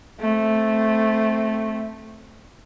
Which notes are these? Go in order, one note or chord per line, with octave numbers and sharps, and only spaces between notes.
A3 C4